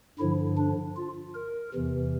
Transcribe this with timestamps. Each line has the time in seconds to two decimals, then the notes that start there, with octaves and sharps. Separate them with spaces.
0.19 G2 D3 F3 E4
0.57 D4
0.97 F4
1.34 A#4
1.74 E2 C3 E3